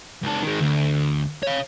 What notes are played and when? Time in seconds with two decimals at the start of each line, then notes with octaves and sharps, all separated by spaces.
0.23 C#2 A4
0.43 D#3 G#3
0.60 D2
1.43 C#5 F5